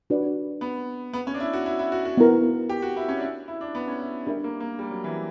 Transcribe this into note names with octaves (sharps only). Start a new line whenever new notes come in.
D4 F#4 B4 D5
B3
B3
C#4
D4
E4
F#4
E4
E4
F#4
F#4
B3 E4 A#4
G4
F#4
E4
C#4
D4
E4
E4
D4
B3
C#4
E4
G3 D4 A#4 E5
A#3
A#3
G3
F#3
E3